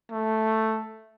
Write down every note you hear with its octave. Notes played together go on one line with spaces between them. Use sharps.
A3